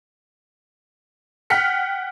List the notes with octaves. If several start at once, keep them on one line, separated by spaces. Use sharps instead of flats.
F#5 G5 F6 B6 C#7